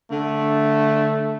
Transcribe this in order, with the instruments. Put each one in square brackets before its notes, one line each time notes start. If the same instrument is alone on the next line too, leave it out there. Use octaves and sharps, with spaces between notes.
[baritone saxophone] D3 [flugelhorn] A3